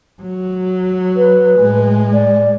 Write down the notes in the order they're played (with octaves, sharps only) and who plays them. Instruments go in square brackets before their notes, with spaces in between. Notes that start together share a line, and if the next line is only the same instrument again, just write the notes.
[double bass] F#3
[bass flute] B4
[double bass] A2 G#3
[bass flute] D5